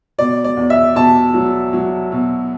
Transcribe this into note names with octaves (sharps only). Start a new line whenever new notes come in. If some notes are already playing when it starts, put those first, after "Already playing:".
B2 D5
D5
E2
E5
B2 A5
F#3
F#3
B2